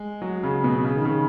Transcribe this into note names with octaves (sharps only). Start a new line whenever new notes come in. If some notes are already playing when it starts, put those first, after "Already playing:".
Already playing: G#3
F#3
C#3
B2
C#3
D#3
C#3